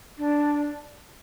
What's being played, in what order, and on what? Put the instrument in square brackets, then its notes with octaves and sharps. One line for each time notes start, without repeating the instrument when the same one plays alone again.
[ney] D4